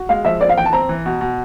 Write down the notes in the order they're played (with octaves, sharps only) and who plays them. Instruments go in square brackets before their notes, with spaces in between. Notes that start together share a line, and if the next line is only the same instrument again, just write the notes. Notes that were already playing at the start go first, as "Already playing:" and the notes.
Already playing: [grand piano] F#4
[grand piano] G#3 [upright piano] F5
[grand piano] F3 [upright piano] E5
[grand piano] C4 [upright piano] D5
[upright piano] F5
[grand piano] E3 [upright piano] G5
[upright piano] A5
[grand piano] C4 [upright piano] A#5
[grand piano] E3
B2
B2